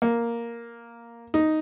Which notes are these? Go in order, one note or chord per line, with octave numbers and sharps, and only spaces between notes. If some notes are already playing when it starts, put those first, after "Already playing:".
A#3
D#4